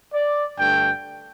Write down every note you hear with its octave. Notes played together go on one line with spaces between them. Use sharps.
D5
G2 D3 A3 G5